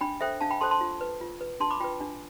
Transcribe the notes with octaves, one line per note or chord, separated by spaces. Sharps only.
D4 G5 B5
A4 C5 E5 G5
D4 F5 A5
G5 B5
A4 C5 A5 C6
A5 C6
F4
B4
F4
B4
D4 A5 C6
B5 D6
F4 B4 G5 B5
D4